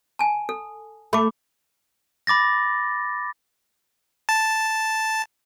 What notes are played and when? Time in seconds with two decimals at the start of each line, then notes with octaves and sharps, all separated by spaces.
0.19 G#5 A5
0.49 A4
1.13 A3 B5 D6
2.27 B5 D6 A6 A#6
4.29 A5